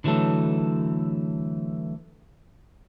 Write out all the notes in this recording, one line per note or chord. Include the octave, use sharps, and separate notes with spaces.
D3 E3 F#3 A3 A4